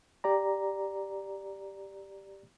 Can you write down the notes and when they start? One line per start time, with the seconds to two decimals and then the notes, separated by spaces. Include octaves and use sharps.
0.24 G4 D5 A#5